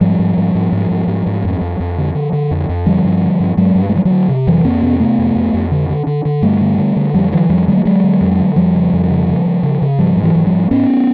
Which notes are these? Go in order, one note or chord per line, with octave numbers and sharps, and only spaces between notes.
G#2 F3 G3
G#2
G#2
G#2
G#2
G#2
G#2
G#2
F2
F2
F2
D3
D3
D3
F2
F2
D3 F3 G3
G2
D3
G2
G2 F#3 G#3
G2
G3
G#3
D3 F3 G3
E3 F#3
D3
C3
F2 E3 F#3
F2 A#3 C4
C3 B3 C#4
C3 A3 B3
F2
F2
F2
D3
D3
D3
D3
G2 G3 A3
D3
D3
D3
F2 F3 G3
D3 E3 F#3
F2 F3 G3
D3 F#3 G#3
A3
D3 F#3 G#3
D3
F2
D3
F2 F3 G3
C#3
F2
C#3
C#3
C#3
C#3
C#3
G#2 F3 G3
G#2
E3 F#3
G#2
F3 G3
G#2
G#2 B3 C#4